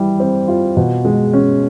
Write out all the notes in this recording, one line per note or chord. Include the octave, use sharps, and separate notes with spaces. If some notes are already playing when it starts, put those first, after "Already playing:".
Already playing: E3 G3
C4
F4
B2
G#3
C#4